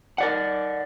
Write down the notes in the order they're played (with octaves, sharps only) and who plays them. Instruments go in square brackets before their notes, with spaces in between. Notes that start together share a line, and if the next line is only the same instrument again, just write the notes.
[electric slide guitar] A#4 D5 F#5